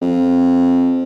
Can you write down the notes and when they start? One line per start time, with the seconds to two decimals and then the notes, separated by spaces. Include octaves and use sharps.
0.01 F2